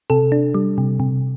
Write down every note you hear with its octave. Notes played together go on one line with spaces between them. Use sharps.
C3 A4
D4
G3
C3
C3